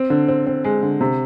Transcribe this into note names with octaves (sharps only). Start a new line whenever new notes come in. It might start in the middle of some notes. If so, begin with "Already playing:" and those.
Already playing: C4
D3
C4
C4
G#3
D3
C3